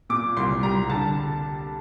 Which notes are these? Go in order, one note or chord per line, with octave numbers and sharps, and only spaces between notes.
A#2 D6
C2 C6
G3 A#5
D3 A5